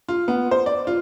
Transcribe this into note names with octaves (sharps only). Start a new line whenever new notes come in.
F4
B3
C5
D5
F4